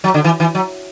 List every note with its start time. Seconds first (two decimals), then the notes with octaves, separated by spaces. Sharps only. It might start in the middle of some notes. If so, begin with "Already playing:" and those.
0.04 F#3
0.14 D3
0.24 E3
0.40 E3
0.55 F#3